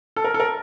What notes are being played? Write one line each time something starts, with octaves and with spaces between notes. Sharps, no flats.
A4
A#4
A4
A#4